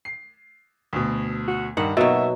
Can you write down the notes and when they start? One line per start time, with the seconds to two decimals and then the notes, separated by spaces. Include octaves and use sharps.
0.05 C7
0.93 D2 B2
1.48 F#4
1.77 G2 D#3 F#5
1.97 B2 F#3 A#3 B3 D#4 E5